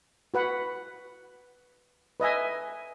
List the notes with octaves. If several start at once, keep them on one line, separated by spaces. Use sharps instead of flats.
F#4 B4 F#5 B5
B4 D#5 E5 G#5